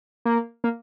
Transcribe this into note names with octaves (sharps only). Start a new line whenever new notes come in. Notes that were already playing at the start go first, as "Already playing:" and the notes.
A#3
A#3